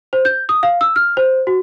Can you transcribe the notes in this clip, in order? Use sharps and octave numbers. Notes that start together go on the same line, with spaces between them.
C5
G6
D#6
F5
E6
F6
C5
F#4